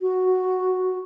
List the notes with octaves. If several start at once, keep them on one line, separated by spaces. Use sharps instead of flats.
F#4